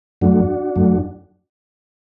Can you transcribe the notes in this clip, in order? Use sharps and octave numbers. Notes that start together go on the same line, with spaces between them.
F#2 F#3 A3 D4 F#4
F#2 F#3 A3